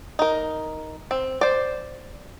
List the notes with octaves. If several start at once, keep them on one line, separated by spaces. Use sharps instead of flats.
D#4 A#4
C4
C5 D5